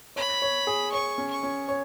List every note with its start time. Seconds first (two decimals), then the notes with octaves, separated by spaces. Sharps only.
0.16 C#5 B5
0.42 C#5
0.67 G#4
0.92 C#5 C#6
1.18 C#4
1.31 C#6
1.43 C#4
1.68 C#5